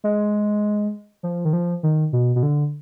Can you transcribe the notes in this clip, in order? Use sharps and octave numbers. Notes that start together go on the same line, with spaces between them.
G#3
F3
D#3
F3
D#3
B2
B2
D3